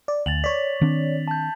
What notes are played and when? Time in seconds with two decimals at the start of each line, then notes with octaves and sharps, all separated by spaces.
0.08 D5
0.26 D2 A6 F7 F#7
0.44 C#5 D5 B6
0.81 D#3 C4 D4
1.28 A5 G6